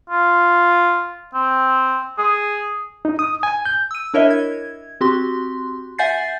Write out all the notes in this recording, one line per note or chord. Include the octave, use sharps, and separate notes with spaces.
F4
C4
G#4
D#4
D#6
G#5
G6
E6 D#7
D4 E4 A#4 C#5 D#5 E5
G#6
C4 F#4 G4 C6
E5 F#5 G#5 G6 A6 C7